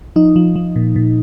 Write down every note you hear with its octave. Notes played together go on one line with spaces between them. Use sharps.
F3 D#4
F3
F3
A#2
A#2